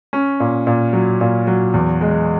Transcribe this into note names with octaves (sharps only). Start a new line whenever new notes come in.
C#4
A#2
A#2
F#3
A#2
F#3
E2
G#3